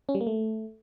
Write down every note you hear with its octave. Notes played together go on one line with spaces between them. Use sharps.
C#4
G3
A#3
A3